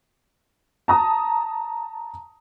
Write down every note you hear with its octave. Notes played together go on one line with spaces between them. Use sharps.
A5 A#5 D#6